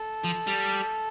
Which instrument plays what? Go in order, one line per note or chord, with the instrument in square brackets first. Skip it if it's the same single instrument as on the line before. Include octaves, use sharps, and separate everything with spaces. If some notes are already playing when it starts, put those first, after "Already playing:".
Already playing: [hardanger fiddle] A4
[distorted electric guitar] F3
G3